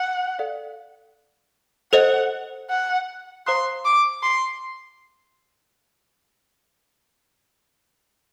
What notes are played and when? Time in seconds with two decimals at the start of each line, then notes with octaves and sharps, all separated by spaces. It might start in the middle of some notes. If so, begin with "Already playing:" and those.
Already playing: F#5
0.39 A4 D5 F5
1.92 A4 C5 D#5 F#5
2.70 F#5
3.46 C5 F5 A#5 C6 D#6 F#6
3.85 D6
4.23 C6